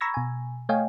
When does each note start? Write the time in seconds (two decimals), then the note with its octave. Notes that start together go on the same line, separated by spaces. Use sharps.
0.01 A#5 B5 C#6 E6 G#6 A#6
0.14 B2 G#5
0.69 A3 C#5 D#5 F5 G5 G#5